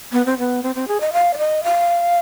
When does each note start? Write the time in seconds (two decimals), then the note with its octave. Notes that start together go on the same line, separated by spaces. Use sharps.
0.12 B3
0.26 C4
0.38 B3
0.63 C4
0.75 C4
0.88 G#4
1.00 D#5
1.13 F5
1.34 D5
1.38 D#5
1.64 F5